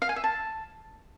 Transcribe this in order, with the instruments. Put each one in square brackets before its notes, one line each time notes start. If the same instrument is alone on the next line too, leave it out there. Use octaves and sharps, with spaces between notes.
[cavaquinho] F5
G#5
E5
A5